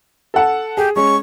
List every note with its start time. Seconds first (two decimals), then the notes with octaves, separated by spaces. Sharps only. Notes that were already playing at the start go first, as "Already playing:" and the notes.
0.34 A4 F#5 A5
0.77 G4 G#4
0.96 G#3 C#4 C#6